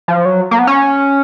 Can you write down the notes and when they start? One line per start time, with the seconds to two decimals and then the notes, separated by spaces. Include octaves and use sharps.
0.08 F3
0.25 F#3
0.51 A#3
0.59 B3
0.67 C#4